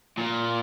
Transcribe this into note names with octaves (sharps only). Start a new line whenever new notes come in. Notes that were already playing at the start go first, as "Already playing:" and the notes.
A#2